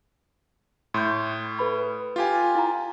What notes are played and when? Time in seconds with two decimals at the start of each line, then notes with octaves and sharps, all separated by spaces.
0.94 A2 C6 G6
1.59 A4 B4 B5
2.16 F4 G4 G#5
2.55 E4 F5 A#5